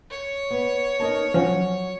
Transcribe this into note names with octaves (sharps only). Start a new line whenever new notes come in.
C#5
B3
D#4 A#4 A5
F3 F#3 C#4